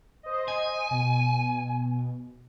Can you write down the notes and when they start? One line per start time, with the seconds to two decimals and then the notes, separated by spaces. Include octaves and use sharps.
0.23 C5 D#5
0.48 G#5
0.91 B2